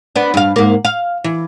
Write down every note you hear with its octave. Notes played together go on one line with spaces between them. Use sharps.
B3 D4
G2 F5
G#2 A#3
F5
E3